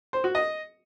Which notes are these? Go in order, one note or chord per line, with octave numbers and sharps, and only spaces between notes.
C5
F#4
D#5